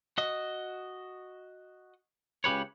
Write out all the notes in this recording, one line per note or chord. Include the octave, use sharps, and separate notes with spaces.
F#4 D#5
C#2 C#3 G4 B4 C#5